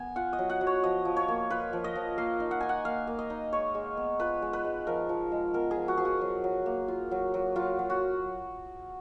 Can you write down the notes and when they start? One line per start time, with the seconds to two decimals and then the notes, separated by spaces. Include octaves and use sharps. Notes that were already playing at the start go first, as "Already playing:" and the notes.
Already playing: B3 G#5
0.16 F4 F#5
0.33 D#5
0.38 F#3
0.50 F#5
0.61 F#3
0.67 C#5
0.83 F3 D#5
1.05 F3
1.17 C#5
1.28 A#3
1.50 F4 B4
1.73 F3
1.84 D#5
1.95 F3
2.18 A#3 F5
2.40 D#4
2.51 F#5
2.61 D#4 G#5
2.69 F#5
2.85 A#3 F5
3.07 A#3
3.19 D#5
3.30 D#4
3.52 G#3 C#5
3.75 G#3
3.97 B3
4.19 F4 B4
4.42 G#3
4.53 B4
4.65 G#3
4.87 F3 A#4
5.09 F3
5.32 G#3
5.54 B3 A#4
5.71 G#4
5.76 F3
5.88 F#4
5.97 F3 G#4
6.05 F#4
6.21 F#3
6.44 F#3
6.66 A#3
6.88 F4
7.11 F#3
7.34 F#3
7.56 F#3 F4
7.79 F#3
7.90 F#4